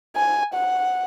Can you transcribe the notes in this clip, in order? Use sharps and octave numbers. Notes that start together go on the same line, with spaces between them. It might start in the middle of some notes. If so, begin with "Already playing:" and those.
G#5
F#5